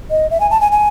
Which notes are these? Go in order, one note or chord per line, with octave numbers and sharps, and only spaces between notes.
D#5
E5
G#5
A5
G#5
G#5